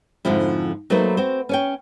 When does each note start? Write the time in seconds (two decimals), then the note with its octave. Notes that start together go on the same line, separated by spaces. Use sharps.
0.25 F2 G#2 D3 F3 C4 E4
0.90 F#3 A3 A#3 D#4 B4 C5
1.17 C4 F#4 C5
1.49 C#4 C#5 G5